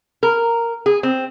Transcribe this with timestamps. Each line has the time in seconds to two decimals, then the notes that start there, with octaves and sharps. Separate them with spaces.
0.23 A#4
0.86 G#4
1.03 C4